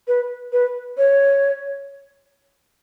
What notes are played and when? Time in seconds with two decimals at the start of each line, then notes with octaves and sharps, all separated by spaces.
0.08 B4
0.52 B4
0.97 C#5